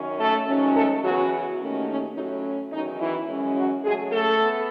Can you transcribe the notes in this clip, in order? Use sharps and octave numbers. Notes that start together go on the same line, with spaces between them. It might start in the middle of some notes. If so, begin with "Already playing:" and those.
Already playing: F#2 D#3 C#4
A3 A4
G#2 D#3 F#3 C#4
A3 A4
C#3 E3 F#3 B3 F#4
D#2 D#3 A3 C#4
C#4
A2 F#3 C#4 D#4
E2 D#3 F#3 C#4 D#4
E3 E4
F#2 E3 G#3 C#4
F#3 F#4
C#3 F#3 G#3 A3 G#4
A3 A4
B3